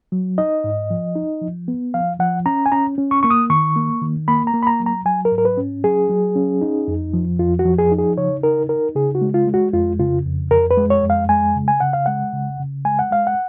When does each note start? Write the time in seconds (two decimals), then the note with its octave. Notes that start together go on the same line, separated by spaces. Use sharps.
0.12 F#3
0.38 D#4 D#5
0.64 G#2
0.90 F3
1.15 D#4
1.42 F3
1.68 B3
1.94 F3 F5
2.19 F3 F#5
2.46 C#4 A#5
2.66 G#5
2.72 C#4 A#5
2.98 C#4
3.11 C#6
3.23 A#3 C#6
3.30 D#6
3.50 D#3 C#6
3.76 A#3
4.02 D#3
4.28 A#3 B5
4.47 A#5
4.54 A#3
4.63 B5
4.67 A#5
4.80 F#3
4.86 A#5
5.05 F#3 G#5
5.25 A#4
5.32 G#2
5.38 A#4
5.45 B4
5.57 C#4
5.84 F#3 G#4
6.10 F#3
6.36 C#4
6.61 D#4
6.88 F2
7.13 F3
7.39 F2 F4
7.59 F#4
7.65 F3
7.78 G#4
7.92 D#4
7.98 G#4
8.17 C#3 C#5
8.43 D#4 A#4
8.69 D#4 A#4
8.95 C#3 G#4
9.15 F#4
9.21 G#3
9.34 F4
9.47 G#3
9.54 F#4
9.73 F2 F4
9.99 C#3 F4
10.25 F2
10.51 F2 A#4
10.71 B4
10.77 G#3
10.90 C#5
11.03 F2
11.10 F5
11.29 G#3 G#5
11.55 C#3
11.68 G#5
11.80 C#3 F#5
11.93 F5
12.06 G#3 F#5
12.33 C#3
12.60 C#3
12.85 G#3 G#5
12.99 F#5
13.11 G#3 F5
13.27 F#5